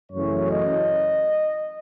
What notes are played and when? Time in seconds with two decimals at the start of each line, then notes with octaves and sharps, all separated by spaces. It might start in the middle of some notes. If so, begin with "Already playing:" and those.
0.12 F#2 C#3 E3 A3 C#4 C#5
0.50 D#5